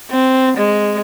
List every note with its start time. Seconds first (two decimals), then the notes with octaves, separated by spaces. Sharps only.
0.11 C4
0.58 G#3